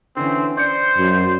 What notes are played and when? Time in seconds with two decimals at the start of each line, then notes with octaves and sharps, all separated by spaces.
0.17 D3 E3 C4 C#4
0.57 C5 D5 G6 C#7
0.98 F#2